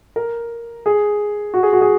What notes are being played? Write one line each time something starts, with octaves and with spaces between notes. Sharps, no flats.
A#4
G#4
F#4
G#4
F#4
G#4